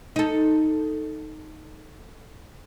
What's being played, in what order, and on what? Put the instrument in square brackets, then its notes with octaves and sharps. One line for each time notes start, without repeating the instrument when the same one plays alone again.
[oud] D#4 A4